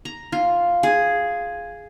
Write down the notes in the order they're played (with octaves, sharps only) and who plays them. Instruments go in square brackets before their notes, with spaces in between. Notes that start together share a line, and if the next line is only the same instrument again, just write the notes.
[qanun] A#5
F4
G#4